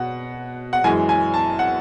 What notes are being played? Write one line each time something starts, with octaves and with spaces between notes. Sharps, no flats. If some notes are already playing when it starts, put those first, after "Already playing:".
Already playing: B2 F#5
F#5
F#2 E3 G#3 G#5
G#5
A5
F#5